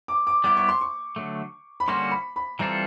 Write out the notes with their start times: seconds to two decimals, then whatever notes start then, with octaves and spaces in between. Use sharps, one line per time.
0.08 D6
0.27 D6
0.44 G3 B3 E4 G4 D6
0.57 C#6
0.69 C6
0.81 C#6
1.16 D3 F#3 A3
1.80 B5
1.88 D3 G3 A#3 C#4 F#4 C6
2.11 B5
2.36 B5
2.59 E3 G3 C4 F4 A4 A#5